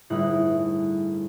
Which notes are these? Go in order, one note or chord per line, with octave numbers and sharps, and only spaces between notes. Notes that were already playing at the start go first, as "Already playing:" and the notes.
G1 A2 D#4 E4 G#4 F#6